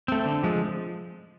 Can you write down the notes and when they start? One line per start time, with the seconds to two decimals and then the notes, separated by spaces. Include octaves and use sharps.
0.08 A3 C4
0.25 D3
0.43 F3 G#3